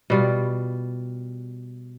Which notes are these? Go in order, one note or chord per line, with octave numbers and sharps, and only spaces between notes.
B2 G3 F4